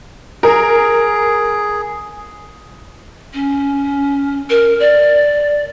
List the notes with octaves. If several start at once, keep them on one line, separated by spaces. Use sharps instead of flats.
G#4 A#4
C#4
A#4
D5